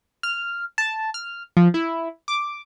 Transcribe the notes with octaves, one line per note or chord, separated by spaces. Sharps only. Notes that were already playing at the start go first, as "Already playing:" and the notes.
F6
A5
F6
F3
E4
D6